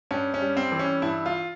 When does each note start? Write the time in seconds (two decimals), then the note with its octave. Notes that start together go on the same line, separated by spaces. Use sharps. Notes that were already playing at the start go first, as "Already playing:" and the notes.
0.11 G2 C#4
0.34 C#4
0.42 G3
0.57 C4
0.72 E3
0.79 C#4
1.02 G2 E4
1.26 F4